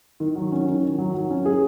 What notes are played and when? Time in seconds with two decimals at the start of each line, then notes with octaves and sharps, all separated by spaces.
0.20 D#3
0.35 F#3
0.52 C#4
0.68 D#3
0.82 D#3
0.98 F#3
1.14 F#3
1.30 C#4
1.46 G#4